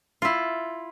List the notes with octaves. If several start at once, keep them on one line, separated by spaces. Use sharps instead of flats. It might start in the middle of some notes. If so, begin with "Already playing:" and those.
E4 F4